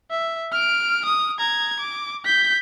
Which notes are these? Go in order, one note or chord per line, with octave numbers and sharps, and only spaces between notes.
E5
F6 D7
D#6
A#5 G#6
D6
G6 B6